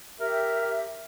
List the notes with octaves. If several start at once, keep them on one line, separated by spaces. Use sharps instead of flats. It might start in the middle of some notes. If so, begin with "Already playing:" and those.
G4 A#4 E5